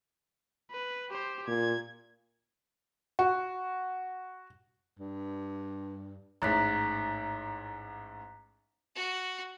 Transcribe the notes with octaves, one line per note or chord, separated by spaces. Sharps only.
B4
G4 C5
A#2 G#6
F#4
G2
A1 G#2 A#5 F#6 B6
F#4